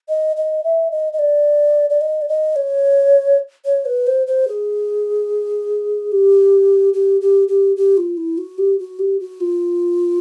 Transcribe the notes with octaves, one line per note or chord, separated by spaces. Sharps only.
D#5
D#5
E5
D#5
D#5
D5
D5
D#5
D5
D#5
C#5
C#5
B4
C5
C5
G#4
G4
G4
G4
G4
G4
F4
E4
F#4
G4
F#4
G4
F#4
F4